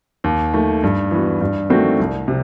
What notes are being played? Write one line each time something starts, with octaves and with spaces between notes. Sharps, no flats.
D#2
D#3 A3
G2
E3 B3 F#4
G2
D#3 A3 C4 F#4
C2
C3